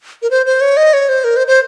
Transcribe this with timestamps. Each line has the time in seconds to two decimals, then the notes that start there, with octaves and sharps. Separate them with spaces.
0.22 A#4
0.31 C5
0.46 C5
0.61 C#5
0.77 D#5
0.93 C#5
1.09 C5
1.24 A#4
1.37 C5
1.47 C5